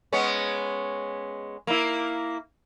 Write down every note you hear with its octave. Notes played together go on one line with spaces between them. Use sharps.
G#3 B3 C#4
A#3 E4